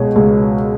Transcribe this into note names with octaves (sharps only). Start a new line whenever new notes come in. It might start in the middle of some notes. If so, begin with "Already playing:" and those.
Already playing: C#2 B2 G#3 G#4 C#5
C#2